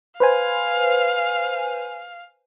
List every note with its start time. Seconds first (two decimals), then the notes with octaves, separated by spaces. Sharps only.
0.20 B4 C5 F5 G#5